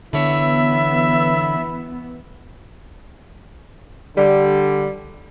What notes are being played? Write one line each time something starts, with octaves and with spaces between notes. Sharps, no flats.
D3 E3 B3 E4 C#5 E5
D3 G3